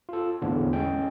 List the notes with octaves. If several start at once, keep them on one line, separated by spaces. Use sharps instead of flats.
F4 A4
E2 A2 D3
G#3 C#4 G5